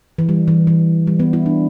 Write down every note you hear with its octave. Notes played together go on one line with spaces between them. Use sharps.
E3
G3
E3
E3
G3
B3
E4
D4